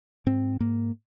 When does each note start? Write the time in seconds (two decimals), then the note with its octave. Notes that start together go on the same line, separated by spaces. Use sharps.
0.26 G#2 C4
0.60 G#2 A#3